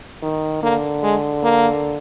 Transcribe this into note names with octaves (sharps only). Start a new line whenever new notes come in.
D#3
D3 A#3
G#3
A#3